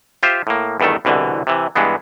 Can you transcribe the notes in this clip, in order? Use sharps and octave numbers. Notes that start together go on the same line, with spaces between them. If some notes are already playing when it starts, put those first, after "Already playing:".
F4 G4 C5 E5
A2 A#3
E2 G2 D#3 A3 A4
C2 B2 D3 E3
C3 E3
G2 E3 G#3 B3